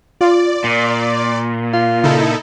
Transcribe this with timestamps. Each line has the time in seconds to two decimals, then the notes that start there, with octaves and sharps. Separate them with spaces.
0.21 F4 D5
0.64 A#2
1.73 F4
2.04 C#3 D#4 E4 A4